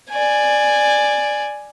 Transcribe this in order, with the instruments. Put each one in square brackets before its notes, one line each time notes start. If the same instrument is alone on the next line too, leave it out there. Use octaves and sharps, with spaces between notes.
[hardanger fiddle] D5 G#5